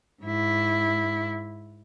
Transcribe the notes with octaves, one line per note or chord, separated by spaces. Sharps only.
G#2 E4